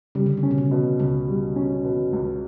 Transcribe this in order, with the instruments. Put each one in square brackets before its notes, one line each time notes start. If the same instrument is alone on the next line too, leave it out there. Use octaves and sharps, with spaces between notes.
[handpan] C#3 [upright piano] G3
[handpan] D3
C#3
[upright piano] C#4
[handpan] B2
C#3
[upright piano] B2
[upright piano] C#2 [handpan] C#3
[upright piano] G3
C#4
B2
C#2